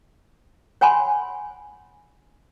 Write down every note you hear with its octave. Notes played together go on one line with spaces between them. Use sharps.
C#5 F#5 G#5 B5 C6